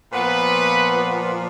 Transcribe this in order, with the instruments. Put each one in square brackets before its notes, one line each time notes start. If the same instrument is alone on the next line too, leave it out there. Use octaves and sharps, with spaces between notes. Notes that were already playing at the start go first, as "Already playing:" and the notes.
[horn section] A#2 F3 B3 B4